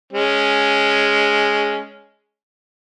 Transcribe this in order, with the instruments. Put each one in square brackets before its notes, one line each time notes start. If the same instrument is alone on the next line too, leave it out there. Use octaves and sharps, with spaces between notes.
[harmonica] G#3 C#4